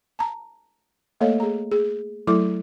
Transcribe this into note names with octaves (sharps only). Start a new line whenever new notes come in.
A5 A#5
A3 A#3 A4 C#5 D#5 F5
G#4 A#5
G#4
F#3 A3 E4 A4 D6